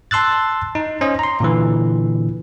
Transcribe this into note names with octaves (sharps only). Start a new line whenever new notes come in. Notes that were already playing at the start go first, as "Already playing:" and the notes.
A5 C6 E6 F#6 A6
D#4
C#4 C5 D#5
A#5 C6
A#2 D3 E3